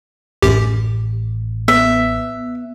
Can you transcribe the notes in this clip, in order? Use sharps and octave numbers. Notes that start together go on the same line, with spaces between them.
A1 F#2 G4
B3 E5